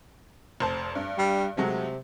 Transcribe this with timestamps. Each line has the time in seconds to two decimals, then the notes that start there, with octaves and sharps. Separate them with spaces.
0.60 F1 C5 A5
0.95 G2
1.18 G3
1.57 C3 F#3 G#3 A3